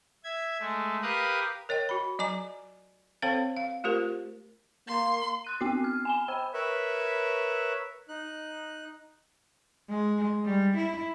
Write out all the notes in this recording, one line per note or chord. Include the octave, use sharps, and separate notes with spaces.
E5 G#6
G#3 A3
G4 A#4 B4 F5 D#6 F#6
A#4 C#5 D#5 G5
F#4 B5
F#3 D#5 G#5 A#5 D6
C4 A4 C5 C#5 F5 G5
F5
A3 F4 G4 A#4 C5
A#3 C6
C6 F#6 D#7
B3 C4 F#4 C7
F6
G#5 E7 G7
C5 G5 B5 E6
A#4 B4 C#5 E5
D#4 F#6
G#3
G3
E4